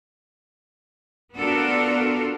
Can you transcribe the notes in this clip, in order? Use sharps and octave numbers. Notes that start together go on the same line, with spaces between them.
B3 D4 F4 F#4 A4 A#4